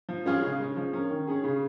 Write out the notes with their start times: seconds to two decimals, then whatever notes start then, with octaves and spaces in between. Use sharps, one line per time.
0.09 F3
0.26 G#3 C#4 F4 G#4
0.43 C#3
0.60 G#3 C#4
0.77 F3
0.93 C#4 A#4
1.10 D#3
1.27 C#4 G#4
1.44 C#3